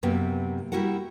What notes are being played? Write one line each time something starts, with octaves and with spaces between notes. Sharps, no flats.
F#2 C3 A#3 B3
G3 E4 F#4 A#4 F#5